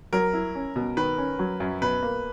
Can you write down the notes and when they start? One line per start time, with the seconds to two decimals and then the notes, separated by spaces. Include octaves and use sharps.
0.13 F#3 A#4
0.33 E4
0.55 C#4
0.76 B2
0.97 D#3 B4
1.18 C#4
1.39 F#3
1.60 F#2
1.81 B2 B4
2.03 A#3